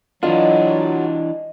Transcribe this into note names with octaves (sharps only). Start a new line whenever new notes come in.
E3 F#3 D4 F4 D#5